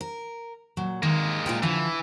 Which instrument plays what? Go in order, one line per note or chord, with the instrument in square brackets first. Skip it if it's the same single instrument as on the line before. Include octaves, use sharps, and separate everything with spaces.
[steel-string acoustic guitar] A#4
A#2 F#3
[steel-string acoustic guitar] D#3 [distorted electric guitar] G#3 A#3
[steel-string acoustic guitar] A#2 F4 G5
[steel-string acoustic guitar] D3 F3 [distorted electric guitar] E3